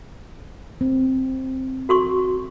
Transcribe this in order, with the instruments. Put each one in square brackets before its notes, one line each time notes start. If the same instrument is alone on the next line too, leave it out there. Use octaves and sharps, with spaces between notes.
[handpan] C4
[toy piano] F#4 C6 C#6